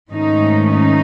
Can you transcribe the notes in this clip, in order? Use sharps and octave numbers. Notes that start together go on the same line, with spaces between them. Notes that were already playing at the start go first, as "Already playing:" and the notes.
G#2 D#3 A3 C#4 D#4
D#4